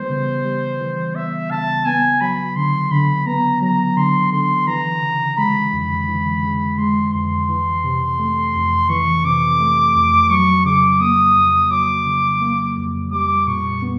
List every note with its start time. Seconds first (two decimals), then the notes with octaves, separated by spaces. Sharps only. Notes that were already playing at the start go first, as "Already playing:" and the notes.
Already playing: E3 G3 B3 C5
0.09 C#3
0.45 G3
0.80 E3
1.15 B3 E5
1.50 C#3 A5
1.85 B3 G#5
2.21 F#3 B5
2.56 D3 C6
2.91 D3 B5
3.26 B3 A#5
3.61 F#3 A#5
3.97 D3 C6
4.32 D3 C6
4.67 E3 A#5
5.02 C#3
5.37 G#3 B5
5.73 F2
6.08 E3
6.43 C#3
6.78 G#3 C6
7.13 F2 C6
7.49 E3
7.84 C3
8.19 A3
8.55 F2
8.89 E3 C#6
9.25 C3 D6
9.60 A3
9.95 F2
10.30 F#3 C#6
10.65 C#3 D6
11.00 A#3 D#6
11.36 F2
11.71 F#3 D6
12.06 C#3
12.41 A#3
12.76 F2
13.12 G3 D6
13.47 A#2 C#6
13.82 B3